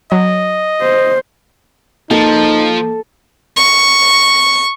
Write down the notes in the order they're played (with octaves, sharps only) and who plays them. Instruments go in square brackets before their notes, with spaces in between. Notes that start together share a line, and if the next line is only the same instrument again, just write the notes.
[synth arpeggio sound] F#3 [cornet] D#5
[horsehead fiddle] C5
[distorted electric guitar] F3 [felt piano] A#3 [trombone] D#4 [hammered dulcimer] A4
[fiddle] C#6